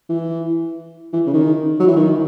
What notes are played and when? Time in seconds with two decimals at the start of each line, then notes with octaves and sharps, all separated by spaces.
0.09 E3
1.13 E3
1.26 C#3
1.33 D#3
1.80 F#3
1.87 E3
1.96 D#3